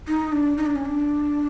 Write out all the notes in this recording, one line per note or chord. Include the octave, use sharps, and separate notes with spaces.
D#4
D4
D#4
D4
C#4
D4